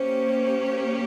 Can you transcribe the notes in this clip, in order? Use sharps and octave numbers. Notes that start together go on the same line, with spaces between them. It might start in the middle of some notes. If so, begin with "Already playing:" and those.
Already playing: A#3 C#4 G4 C5 C#5